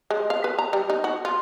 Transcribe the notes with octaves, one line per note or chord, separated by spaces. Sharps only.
G#3
F5
B4
A#5
G3
D#4
F#4
F4